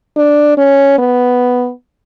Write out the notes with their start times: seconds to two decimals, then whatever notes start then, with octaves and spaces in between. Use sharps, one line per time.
0.17 D4
0.57 C#4
0.98 B3